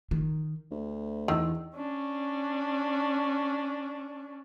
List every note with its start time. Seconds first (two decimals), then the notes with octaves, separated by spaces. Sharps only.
0.11 D#3
0.71 D2
1.28 E2 D#3 E6
1.76 C#4 D4